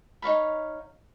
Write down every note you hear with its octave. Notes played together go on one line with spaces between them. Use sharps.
D#4 C#5 F5 B5